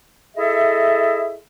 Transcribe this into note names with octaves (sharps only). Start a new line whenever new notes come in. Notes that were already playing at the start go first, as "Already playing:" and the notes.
E4 G#4 A4 D#5 E5